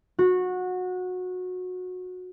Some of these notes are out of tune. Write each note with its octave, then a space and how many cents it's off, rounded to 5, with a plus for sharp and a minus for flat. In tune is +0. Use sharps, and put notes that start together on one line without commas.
F#4 -20